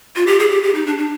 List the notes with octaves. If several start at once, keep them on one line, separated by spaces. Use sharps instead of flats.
F4
G4
G#4
G4
G4
D#4
D4
D4